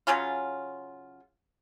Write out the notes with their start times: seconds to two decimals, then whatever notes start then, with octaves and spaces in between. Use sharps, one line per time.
0.07 C#3 F#3 C#4 F4